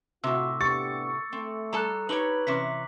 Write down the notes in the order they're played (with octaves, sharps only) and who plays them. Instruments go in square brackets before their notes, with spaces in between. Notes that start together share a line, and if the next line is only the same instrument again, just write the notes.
[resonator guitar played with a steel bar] A2 C3 [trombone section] F4 F#4 [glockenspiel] C#6 D6 E6
[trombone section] B3 D4 G4 [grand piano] C#6 A6 [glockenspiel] C#7
[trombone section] A3 [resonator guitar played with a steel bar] C4
[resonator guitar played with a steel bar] G3 A4 A5 [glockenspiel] A#5 F#6
[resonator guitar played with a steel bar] D#4 G4 C#5 [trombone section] B4 [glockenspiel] F#7
[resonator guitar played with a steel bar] C3 E3 C#4 [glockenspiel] D6 B6